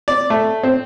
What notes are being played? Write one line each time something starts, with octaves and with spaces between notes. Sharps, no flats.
D5
A3
C4